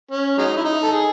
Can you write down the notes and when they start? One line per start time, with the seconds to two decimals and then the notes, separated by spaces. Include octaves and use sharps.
0.11 C#4
0.38 F#3 G#3 D#4
0.57 E4
0.65 D#4
0.83 A4
0.92 G#4